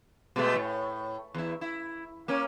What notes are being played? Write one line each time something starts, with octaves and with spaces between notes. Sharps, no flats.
B2 G#3 A3
A2
E2 E4
E4
A#3 C#4